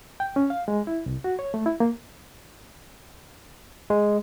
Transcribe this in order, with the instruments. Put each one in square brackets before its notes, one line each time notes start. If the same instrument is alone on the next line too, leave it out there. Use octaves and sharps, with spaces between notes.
[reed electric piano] G5
C#4
F5
G#3
E4
C2
F#4
C#5
A3
E4
A#3
[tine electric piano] G#3